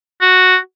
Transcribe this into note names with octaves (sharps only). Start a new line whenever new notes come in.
F#4